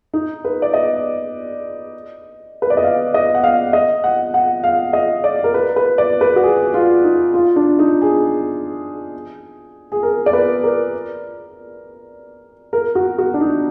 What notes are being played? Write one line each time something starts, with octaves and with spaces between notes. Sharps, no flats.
D#4
B4
D5
D#5
B4
D5
D#5
F5
D#5
F#5
F5
D#5
F#5
F#5
F5
D#5
D5
A#4
B4
B4
D5
B4
F#4
G#4
F4
D#4
F4
D4
D#4
G#4
G#4
A#4
D5
B4
A#4
A#4
F#4
F#4
D4
D#4